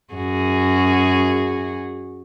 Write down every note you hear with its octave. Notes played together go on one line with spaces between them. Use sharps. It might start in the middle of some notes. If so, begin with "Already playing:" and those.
F#2 F#4 G#4